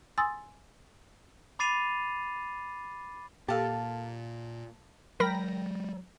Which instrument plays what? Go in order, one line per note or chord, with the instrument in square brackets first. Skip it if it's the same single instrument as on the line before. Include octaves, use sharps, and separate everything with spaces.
[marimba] G#5 C6 D#6 E6 A6
[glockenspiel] B5 D6 A6 C7 D#7 F7
[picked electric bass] A#2 [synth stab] G4 A4 [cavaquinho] F5 A5
[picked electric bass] F#3 G#3 [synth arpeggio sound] A#4 B5 [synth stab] G5 A#6